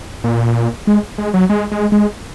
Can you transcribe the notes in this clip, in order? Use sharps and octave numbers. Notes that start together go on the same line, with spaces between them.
A#2
G#3
G#3
F#3
G#3
G#3
G#3